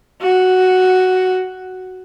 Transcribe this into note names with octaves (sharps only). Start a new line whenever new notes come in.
F#4